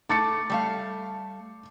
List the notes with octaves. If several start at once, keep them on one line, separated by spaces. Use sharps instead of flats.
A3 D6 A6 C#7
G3 A3 F5